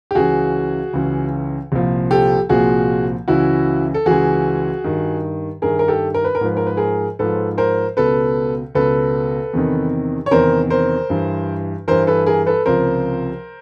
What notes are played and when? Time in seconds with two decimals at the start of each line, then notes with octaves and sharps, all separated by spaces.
0.11 G4
0.15 C#2 C#3 E3 F#4 G#4
0.93 C#2 C#3 E3
1.72 C2 A#2 F3
2.11 G4 A4
2.49 C2 A#2 F3 F#4 G#4
3.28 C#2 C#3 E3 E4 F#4
3.94 A4
4.06 C#2 C#3 E3 F#4 G#4
4.84 G2 D#3
5.62 G2 D#3 G#4 A#4
5.79 A#4
5.88 G4 A4
6.14 A#4
6.24 B4
6.35 A#4
6.41 G#2 F3 B4
6.57 A#4
6.67 B4
6.77 G#4 A#4
7.19 G#2 F3 A4 B4
7.58 A#4 C5
7.97 C#2 B2 A4 B4
8.75 C#2 B2 A4 B4
9.53 E2 C3 D#3
10.26 C#5
10.31 E2 C3 D#3 A#4 C5
10.70 A#4 C5
11.10 G2 E3
11.88 G2 E3 A#4 C5
12.07 A4 B4
12.26 G#4 A#4
12.46 A4 B4
12.66 C#2 C3 F3 A#4 C5